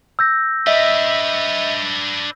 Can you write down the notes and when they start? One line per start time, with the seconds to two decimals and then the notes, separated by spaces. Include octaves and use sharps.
0.19 E6 G6 A#6
0.67 D4 B4 D#5 E5